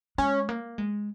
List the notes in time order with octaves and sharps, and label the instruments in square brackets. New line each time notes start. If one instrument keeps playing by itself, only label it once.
[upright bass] G#3 [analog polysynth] C#4
[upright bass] A#3
G#3